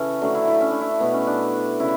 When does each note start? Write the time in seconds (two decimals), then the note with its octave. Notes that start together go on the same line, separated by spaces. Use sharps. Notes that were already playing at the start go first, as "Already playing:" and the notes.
Already playing: C#3 E3 C#4 A4
0.21 D3 F#3 A3 D4
0.35 E4
0.48 E4
0.61 C#4
0.71 D4
0.81 E4
0.90 D4
1.00 B2 A3 B3
1.14 C#4
1.27 D4
1.80 C#3 E4